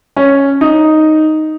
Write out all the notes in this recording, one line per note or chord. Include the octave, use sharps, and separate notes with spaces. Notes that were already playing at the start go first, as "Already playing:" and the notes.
C#4
D#4